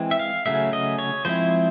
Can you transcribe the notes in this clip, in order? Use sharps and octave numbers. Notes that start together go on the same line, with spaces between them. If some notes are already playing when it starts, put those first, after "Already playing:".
Already playing: E3 G#3 C4
E5
F5
C#3 F#3 A3 C#4 E5
D#5
C#5
F3 G#3 C4 E4 C5